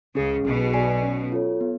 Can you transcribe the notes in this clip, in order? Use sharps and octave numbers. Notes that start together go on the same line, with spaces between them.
C#2 C#3 C#4 G#4
B1 B2 G#4
D5 G#5
C#4
F4 A4 C#5
B3